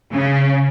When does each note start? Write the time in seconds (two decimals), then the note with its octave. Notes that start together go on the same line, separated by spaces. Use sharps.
0.11 C#3